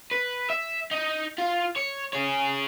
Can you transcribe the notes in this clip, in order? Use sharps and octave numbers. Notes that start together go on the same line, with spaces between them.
B4
E5
D#4
F4
C#5
G#4 C#5